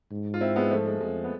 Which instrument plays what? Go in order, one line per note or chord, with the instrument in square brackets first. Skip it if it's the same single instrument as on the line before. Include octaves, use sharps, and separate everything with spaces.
[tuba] G#2
[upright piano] F4
C4 E4
G#3 B3
F3 A3
G#3
[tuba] F2 [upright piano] G#3
[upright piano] B3